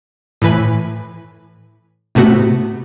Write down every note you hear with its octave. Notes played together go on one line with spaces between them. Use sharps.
A2 E3 B4 G#5
A2 C3 A3 B3 F#4